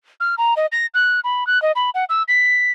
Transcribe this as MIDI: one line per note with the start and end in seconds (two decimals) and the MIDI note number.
0.20 0.35 89
0.38 0.54 82
0.57 0.66 75
0.72 0.86 94
0.94 1.20 90
1.24 1.46 83
1.47 1.61 90
1.62 1.72 75
1.76 1.90 83
1.94 2.05 78
2.09 2.23 88
2.28 2.72 95